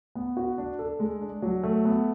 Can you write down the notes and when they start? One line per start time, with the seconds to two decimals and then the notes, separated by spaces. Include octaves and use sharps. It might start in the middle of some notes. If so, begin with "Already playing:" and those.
0.15 B3
0.37 F#4
0.58 D4
0.79 A4
1.00 G#3
1.21 D4
1.42 F#3
1.63 A3
1.85 B3